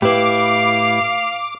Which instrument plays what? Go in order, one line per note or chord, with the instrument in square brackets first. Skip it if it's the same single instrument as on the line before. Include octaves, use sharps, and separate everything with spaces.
[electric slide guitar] A2 E4 [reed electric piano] G4 B4 [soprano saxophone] F5 [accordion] D6